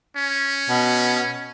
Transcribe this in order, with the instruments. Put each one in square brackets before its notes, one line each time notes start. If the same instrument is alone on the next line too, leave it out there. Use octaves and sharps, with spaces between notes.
[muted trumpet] C#4
[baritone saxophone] B2